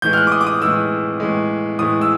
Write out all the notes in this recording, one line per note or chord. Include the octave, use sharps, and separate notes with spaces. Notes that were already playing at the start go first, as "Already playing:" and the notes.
A2 E3 G#3 G6
F6
F#6
D6
D#6
D6
D#6
A2 E3 G#3 E6
A2 E3 G#3
A2 E3 G#3 D#6
E6